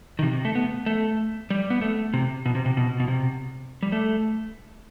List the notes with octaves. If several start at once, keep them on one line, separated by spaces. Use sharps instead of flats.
D#3
C3
C3
A3
B3
A3
G3
B3
A3
C3
B2
C3
C3
B2
B2
C3
G3
A3